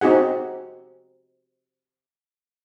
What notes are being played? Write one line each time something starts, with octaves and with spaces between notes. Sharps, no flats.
C4 D#4 F#4 G#4 F#5